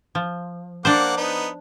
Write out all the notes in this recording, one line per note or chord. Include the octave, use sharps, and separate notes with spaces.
F3
A#3 D4 C5 F#5 D6
B3 D#4